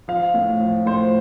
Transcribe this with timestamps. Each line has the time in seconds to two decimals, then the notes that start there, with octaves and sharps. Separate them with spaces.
0.08 F3 F5
0.34 A2
0.60 F3
0.86 A2 C5